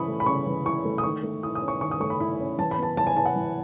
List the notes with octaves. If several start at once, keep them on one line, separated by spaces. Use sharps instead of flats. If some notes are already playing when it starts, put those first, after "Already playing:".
Already playing: C#3 E3 E4 B5 C#6 D#6
A3
B5
C#3 C#6
E3
E4 C#6
A3
D#6
D#3 C#6
A3
E4 D#6
D#6
C#4
C#6
D#3 C#6
D#6
A3 C#6
B5
E4 B5
C#4
E3 A5
B5
B3
A5
E3 A5
G#5
E4 A5
F#5
E3